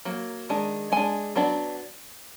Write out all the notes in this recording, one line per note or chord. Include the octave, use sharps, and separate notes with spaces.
F#3 A#3
D#3 G#3 D4
G#3 D4 G#5
F#3 B3 D4